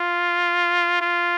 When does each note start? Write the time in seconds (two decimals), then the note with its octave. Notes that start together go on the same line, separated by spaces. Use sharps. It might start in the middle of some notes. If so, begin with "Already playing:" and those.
Already playing: F4
1.01 F4